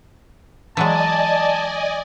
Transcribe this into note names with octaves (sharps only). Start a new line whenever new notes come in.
E3 F#3 G#3 D5 D#5 G#5 A5